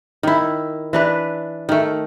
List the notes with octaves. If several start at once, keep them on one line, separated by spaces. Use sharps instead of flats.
D#3 E4
E3 D4 B4
D#3 A3